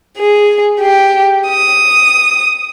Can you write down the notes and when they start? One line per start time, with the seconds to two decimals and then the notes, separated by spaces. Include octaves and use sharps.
0.17 G#4
0.80 G4
1.48 D#6